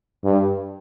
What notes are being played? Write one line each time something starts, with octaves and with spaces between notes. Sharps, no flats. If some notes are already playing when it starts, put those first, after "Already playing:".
G2